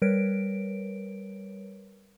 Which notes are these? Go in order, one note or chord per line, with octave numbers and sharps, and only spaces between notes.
G3 A#4 B4 C#5 D7